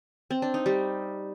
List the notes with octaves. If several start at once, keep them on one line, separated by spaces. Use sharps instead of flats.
C4
D4
D#4
G3